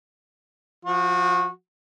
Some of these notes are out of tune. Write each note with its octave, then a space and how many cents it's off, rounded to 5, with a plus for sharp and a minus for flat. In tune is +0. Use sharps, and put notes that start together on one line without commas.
F3 +0 F#4 -25